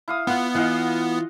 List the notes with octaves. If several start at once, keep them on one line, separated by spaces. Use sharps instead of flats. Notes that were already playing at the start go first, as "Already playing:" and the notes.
E4 F5 D#6
B3 F4 F#5
E3 F4 D#5 F5 F#5